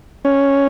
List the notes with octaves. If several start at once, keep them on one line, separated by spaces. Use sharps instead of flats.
C#4